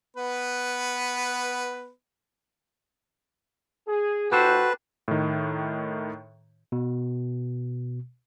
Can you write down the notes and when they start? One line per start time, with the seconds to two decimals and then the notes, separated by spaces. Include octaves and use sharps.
0.16 B3 B4
3.87 G#4
4.32 G1 F#4 G4 A4 B4 C5
5.08 A2 D#3
6.72 B2